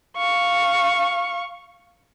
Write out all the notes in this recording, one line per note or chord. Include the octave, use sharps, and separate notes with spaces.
F5 C#6